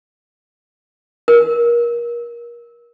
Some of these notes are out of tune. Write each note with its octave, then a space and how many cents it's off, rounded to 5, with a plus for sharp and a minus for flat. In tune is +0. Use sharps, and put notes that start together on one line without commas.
A#4 +25